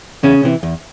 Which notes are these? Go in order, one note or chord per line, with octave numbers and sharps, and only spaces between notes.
E2 C#3 C#4
C3 E3
E2